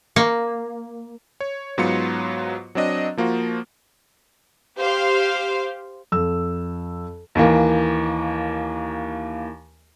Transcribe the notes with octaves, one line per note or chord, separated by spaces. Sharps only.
A#3
C#5
G#2 F#3 B3 F4 C6 C#7
F#3 C4 D4 D#5
F3 A#3 F4 F#4
G4 C5 F5
F2 E6
D#2 E3 A#3